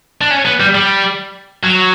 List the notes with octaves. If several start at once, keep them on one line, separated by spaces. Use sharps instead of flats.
D4
C#4
B3
G3
G3
F#3